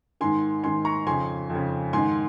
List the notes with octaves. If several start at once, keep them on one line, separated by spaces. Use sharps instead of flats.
G#2 D#3 G#5 C6
G#2 D#3 G#5 C6
A#5 C#6
F2 C#3 G#5 C6
F2
C#3
G#2 D#3 G#5 C6